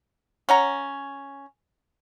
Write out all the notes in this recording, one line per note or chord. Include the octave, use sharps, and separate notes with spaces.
C#4 F#5 A#5